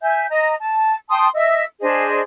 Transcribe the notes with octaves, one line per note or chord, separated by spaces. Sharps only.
E5 G#5 G6
D#5 A#5
A5
G5 A5 C6 D#6
D#5 E5 E6
D4 G#4 C5 D#5